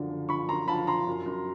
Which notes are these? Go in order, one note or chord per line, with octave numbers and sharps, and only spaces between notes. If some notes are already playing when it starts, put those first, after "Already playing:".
Already playing: F#2 D3 F3
D3
F3 B5 C#6
F#2 A#5 C6
F3 A5 B5
F3 A#5 C6
F#2
F#2